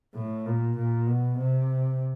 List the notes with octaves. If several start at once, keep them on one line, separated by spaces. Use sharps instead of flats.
A2
A#2
A#2
B2
C3